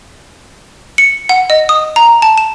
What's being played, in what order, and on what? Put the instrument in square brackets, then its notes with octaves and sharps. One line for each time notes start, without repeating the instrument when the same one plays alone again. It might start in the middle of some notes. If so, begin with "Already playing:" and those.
[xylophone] C#7
F#5
D#5
D#6
A#5
A5
E7